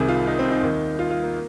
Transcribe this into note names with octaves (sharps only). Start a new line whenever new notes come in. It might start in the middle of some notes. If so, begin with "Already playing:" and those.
Already playing: C2 C3 D#3 G#4
F4
D#4
C4
D#4
D#2 D#3
F4
F4
A#3